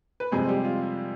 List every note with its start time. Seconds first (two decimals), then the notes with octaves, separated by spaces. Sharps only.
0.20 B4
0.32 F2 C3 G3 G#3 C4 G#4
0.48 G3 G4
0.65 F4